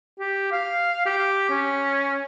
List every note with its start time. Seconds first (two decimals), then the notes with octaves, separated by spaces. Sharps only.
0.19 G4
0.52 F5
1.06 G4
1.50 C#4